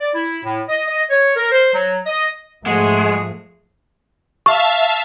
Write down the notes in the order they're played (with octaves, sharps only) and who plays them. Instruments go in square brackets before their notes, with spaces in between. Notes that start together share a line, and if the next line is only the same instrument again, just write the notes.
[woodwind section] D5
E4
A2
D#5
D#5
C#5
A#4
C5
F#3
D#5
[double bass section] G#2 F3 A3 [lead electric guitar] G#3 [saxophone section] F#4 G#4
[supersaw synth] E5 F5 A5 [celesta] C#6